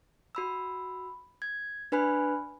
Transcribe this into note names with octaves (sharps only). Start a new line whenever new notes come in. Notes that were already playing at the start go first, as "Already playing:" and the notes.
F#4 B5 E6
G#6
D4 B4 G#5 B5 F#6